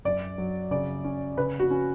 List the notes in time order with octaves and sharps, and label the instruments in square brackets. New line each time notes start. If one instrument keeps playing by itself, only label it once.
[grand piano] F#2 [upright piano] D5
[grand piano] F#3
[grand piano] C#3 [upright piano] D5
[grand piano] C#4
[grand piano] C#3 [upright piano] B4
[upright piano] F#4
[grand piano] C#4